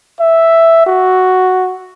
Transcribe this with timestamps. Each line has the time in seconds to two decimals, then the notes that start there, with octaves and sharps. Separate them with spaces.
0.20 E5
0.87 F#4